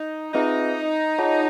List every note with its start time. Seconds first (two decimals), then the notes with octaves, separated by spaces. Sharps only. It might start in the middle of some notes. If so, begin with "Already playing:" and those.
Already playing: D#4
0.34 C4 D#4 F4 G#4 B4 E5
1.18 F4 G#4 C#5 F#5 A5